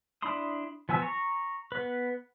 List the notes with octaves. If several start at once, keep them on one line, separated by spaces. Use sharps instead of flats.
D4 E4 B5 C6 D#6
F3 B3 G#5 E6
A#5 C#6
B3 B4